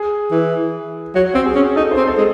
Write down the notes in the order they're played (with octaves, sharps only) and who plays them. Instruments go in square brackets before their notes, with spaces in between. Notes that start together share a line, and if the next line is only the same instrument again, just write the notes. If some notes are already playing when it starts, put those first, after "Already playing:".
Already playing: [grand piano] G#4
[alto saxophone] E3
[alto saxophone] F#3 [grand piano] F#4
[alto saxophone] C4 [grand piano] F#4
[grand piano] G#4
[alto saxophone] C#4
[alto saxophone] D#4 [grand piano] A4
[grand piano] C5
[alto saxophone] C4
[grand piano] A4
[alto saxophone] G#3